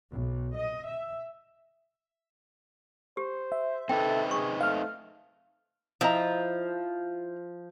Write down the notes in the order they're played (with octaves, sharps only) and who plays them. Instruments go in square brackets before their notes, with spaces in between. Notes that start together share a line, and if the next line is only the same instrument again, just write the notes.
[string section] B1
D#5
E5
[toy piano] G4 [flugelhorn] C5
[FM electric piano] E5
[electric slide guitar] C4 D#4 B4 [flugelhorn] A4 [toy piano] G5
[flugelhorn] G#4 [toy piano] C#6
[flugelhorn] A3 [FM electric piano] F5 F6
[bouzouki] F3 [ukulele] E4 D#5 A#5